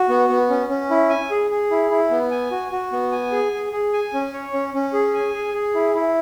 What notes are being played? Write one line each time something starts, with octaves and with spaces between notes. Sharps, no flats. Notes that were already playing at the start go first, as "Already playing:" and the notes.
Already playing: F#4
B3
B3
C#4
C#4
E4
G#5
G#4
G#4
E4
E4
B3
G#5
F#4
F#4
B3
G#5
G#4
G#4
G#4
G#5
C#4
C#5
C#4
C#4
G#4
G#5
G#4
G#4
E4
E4